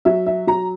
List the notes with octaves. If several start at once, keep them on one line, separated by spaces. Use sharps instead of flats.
F#3 E5
E5
F#3 A#5